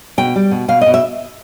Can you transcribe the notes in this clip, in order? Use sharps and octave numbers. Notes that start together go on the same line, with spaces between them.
B2 G5
G3
B2
B2 F5
D#5
B2
E5